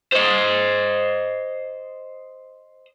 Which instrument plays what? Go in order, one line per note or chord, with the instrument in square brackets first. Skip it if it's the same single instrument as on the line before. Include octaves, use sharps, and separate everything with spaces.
[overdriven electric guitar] C5 D#5